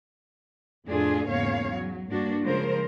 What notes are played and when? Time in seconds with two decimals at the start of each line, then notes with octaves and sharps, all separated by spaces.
0.87 F2 A2 A3 D4 F4 G#4
1.28 E2 G#2 C#3 A#3 C#5 F5
1.72 F#3
2.09 G2 A#3 D4 F#4
2.42 C#3 F3 G#3 A#4 C5